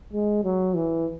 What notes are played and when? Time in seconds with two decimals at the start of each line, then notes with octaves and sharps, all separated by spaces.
0.13 G#3
0.44 F#3
0.74 E3